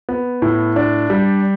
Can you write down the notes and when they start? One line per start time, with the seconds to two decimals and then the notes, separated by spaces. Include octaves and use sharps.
0.09 B3
0.42 A2
0.76 D4
1.10 G3